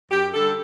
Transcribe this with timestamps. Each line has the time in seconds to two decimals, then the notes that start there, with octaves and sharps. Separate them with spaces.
0.10 F#2 G4
0.34 D3 G3 A4